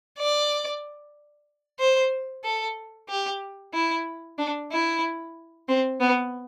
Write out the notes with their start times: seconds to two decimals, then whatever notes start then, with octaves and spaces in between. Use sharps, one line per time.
0.19 D5
1.80 C5
2.44 A4
3.09 G4
3.74 E4
4.38 D4
4.72 E4
5.69 C4
6.01 B3